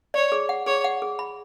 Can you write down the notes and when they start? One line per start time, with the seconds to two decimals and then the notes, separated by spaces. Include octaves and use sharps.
0.14 C#5 D5
0.32 G#4
0.49 F#5
0.66 G#4 C#5
0.84 F#5
1.02 G#4
1.19 B5